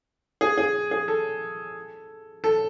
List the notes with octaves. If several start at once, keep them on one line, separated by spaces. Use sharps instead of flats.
G#4
G#4
G#4
A4
A4